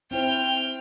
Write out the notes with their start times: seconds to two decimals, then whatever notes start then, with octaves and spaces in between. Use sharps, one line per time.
0.11 C4 E4 C5 G5 F6